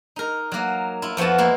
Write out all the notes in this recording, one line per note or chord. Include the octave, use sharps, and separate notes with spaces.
D#4 A#4
F#3 A#3
E4 F4
F2 F3 B3 F#4 A5
G#3 A#3 E4